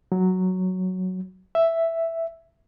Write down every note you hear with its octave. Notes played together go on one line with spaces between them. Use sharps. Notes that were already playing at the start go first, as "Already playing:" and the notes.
F#3
E5